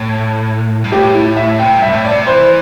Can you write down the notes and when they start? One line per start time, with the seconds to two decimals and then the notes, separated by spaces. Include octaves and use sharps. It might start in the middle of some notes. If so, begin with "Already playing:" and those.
Already playing: A2
0.84 G2
0.92 A2 G4
1.15 E4
1.37 E5
1.59 C3 G5
1.76 G2
1.82 E5
1.93 A2
2.05 D5
2.10 C3
2.27 E3 C5